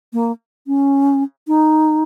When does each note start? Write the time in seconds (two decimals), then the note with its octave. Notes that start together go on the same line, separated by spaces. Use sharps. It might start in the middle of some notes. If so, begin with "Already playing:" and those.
0.13 A#3
0.67 C#4
1.48 D#4